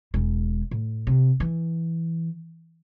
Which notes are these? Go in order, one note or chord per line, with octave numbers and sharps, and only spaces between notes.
E1 G#3
A2
C3
E3